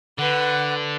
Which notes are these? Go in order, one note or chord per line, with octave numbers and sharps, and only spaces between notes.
D3 B4 F#5